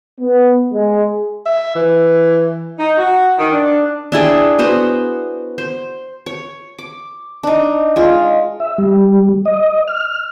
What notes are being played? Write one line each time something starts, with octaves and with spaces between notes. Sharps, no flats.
B3
G#3
E5
E3
D#4
F#4
D#3
D4
D4 E4 G#4 G5
B3 F#4 C5
C5
C#5
D6
D4 D#4
G#3 F4
E5
G3
D#5
F6